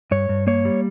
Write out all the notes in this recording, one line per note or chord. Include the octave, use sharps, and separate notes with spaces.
G2 C#5
G2
A#3 C#5
G3